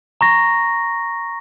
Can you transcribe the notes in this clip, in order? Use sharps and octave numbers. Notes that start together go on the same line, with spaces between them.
A#5 C#6 A#6